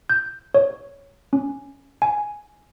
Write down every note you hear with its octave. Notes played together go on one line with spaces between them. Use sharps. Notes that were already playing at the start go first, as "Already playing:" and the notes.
G6
C#5
C#4
G#5